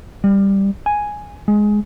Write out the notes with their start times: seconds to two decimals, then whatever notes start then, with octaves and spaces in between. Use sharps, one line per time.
0.24 G3
0.86 G#5
1.48 G#3